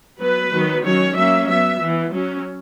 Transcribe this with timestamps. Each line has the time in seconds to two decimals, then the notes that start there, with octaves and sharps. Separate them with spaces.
0.19 F#3 B3 B4
0.52 D#3 F#3 B3
0.84 D#3 F#3 C#4 C#5
1.16 F#3 A#3 C#4 E5
1.49 F#3 B3 E5
1.81 E3 B3
2.13 F#3 C#4